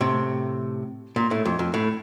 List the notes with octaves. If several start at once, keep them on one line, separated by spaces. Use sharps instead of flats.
A2 C3
A#2
A2
F2
F2
A2